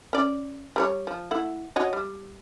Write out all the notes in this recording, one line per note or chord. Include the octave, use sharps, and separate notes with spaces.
C#4 D5
G3 A#4 C#5
F3
A3 E4 F#5
F#4 C#5 D#5
G3